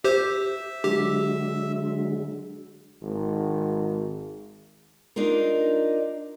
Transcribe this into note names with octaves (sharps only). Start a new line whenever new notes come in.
G4 C5 E5
D3 F#3 G#3 G4
G#1
D4 D#4 F4 A#4